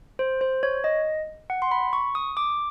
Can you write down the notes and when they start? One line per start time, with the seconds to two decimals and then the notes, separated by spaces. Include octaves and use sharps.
0.19 C5
0.41 C5
0.63 C#5
0.84 D#5
1.50 F#5
1.62 C6
1.71 B5
1.93 C#6
2.15 D#6
2.37 D6